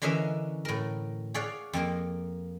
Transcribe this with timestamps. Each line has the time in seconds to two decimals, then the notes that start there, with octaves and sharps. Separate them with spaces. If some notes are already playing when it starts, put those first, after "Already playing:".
0.02 D3 E3 C#4 A#4 D#5 E5
0.65 A2 A#4
1.34 G#4 C#5 D5 F5 F#5
1.73 F2 A#3 A#4